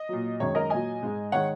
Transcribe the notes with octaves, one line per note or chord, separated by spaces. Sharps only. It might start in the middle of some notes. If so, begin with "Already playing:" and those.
Already playing: D#5
A#2 F#3
F#2 D#3 G#3 C#5
A#4 D#5
A#2 F#3 D#5 G#5
G#2 G#3
D#3 G#3 C#5 F#5